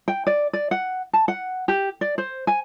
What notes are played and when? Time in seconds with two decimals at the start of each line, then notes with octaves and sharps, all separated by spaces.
0.08 G5
0.27 D5
0.53 D5
0.71 F#5
1.13 A5
1.28 F#5
1.68 G4
2.01 D5
2.18 C5
2.47 G#5